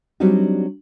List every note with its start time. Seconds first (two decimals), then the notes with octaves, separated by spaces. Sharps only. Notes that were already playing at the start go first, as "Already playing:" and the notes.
0.20 F#3 G3 C4 D4 D#4 F#4